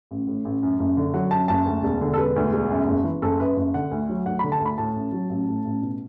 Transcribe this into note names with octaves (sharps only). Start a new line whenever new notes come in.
A1
A2
A1
F#2
F#1
D3
F#3 F#5
F#2 A5
F#1 A5
D2
E1
D3
A4
E1 B4
D2
E1
F#2
F#1
E3
F#1 A4
F#2 B4
F#1
D3 F#5
D2
F#3
D2 F#5
B5
D3
A5
D2
B5
A2 A5
A1
F#3
A1
A2
A1
B2